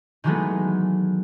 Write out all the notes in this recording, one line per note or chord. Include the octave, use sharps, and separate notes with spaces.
D#3 E3 F#3 G#3 A3 B3